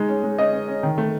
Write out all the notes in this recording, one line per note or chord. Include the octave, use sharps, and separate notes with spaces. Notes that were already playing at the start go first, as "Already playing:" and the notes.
Already playing: G#3 D#4
C#4
G#3
C#4 D#5
C#4
C#4
D#3
A3